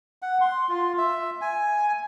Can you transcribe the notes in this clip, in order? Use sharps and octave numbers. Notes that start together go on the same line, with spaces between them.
F#5
C6
F4
E5
G#5